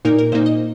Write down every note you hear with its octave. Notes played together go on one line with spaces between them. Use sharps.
A#2 A#3 D#4 A#4
A#4
A#2 A#3 D#4 C5
D#5